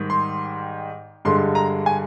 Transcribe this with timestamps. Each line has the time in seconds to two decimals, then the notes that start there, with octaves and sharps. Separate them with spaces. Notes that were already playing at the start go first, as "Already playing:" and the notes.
Already playing: G#2 D#3 G3
0.10 C6
1.25 G2 D3 G#3 C6
1.55 A#5
1.86 G#5